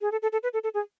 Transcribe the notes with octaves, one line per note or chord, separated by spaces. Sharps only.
G#4
A4
A4
A4
B4
A4
A4
G#4